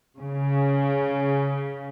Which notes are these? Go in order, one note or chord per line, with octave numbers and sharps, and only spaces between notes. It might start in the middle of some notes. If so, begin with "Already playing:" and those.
C#3